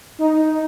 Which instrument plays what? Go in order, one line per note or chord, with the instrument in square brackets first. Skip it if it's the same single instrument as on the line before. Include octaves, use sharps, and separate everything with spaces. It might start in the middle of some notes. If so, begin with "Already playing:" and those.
[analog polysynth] D#4